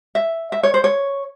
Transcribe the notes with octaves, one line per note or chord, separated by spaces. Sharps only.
E5
E5
C#5
C5
C#5